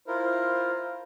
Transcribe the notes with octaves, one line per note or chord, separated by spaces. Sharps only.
E4 F4 A#4 C5